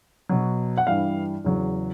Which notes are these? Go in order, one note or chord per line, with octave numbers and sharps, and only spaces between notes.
B2 F#3
F#5
G2 E3 G3 F5
E2 C#3 F#3